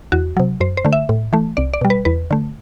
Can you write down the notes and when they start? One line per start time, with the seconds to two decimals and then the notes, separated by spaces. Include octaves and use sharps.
0.12 E2 F#4
0.37 C3 F#3
0.61 F#2 C5
0.77 C5
0.85 D3 A3
0.93 E5
1.09 A2
1.33 E3 A3
1.57 C2 D5
1.74 D5
1.81 B2 G3
1.90 B4
2.05 E2 B4
2.31 D3 A3